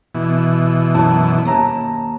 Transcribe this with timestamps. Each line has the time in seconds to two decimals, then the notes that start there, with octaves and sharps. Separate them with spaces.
0.15 B2 E3
0.94 F#2 E4 A5
1.45 D#2 A5 A#5